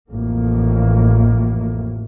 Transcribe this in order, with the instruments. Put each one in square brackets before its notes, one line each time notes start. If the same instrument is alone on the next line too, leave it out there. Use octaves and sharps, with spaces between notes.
[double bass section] A1 F2 A2 A#3